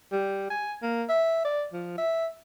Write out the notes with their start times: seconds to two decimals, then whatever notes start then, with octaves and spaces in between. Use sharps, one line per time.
0.12 G3
0.50 G#5
0.82 A#3
1.09 E5
1.45 D5
1.73 F3
1.98 E5